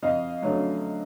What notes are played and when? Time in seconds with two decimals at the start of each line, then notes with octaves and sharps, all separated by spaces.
0.03 F2 D#5 F5
0.42 D3 F#3 A3 C#4